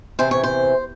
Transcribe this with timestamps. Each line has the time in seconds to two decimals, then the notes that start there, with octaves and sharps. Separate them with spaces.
0.19 E2 C3 E3 C5
0.31 C#5
0.44 C5